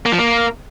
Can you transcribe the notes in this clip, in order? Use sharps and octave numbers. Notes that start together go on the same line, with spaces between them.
A#3
F3
A#3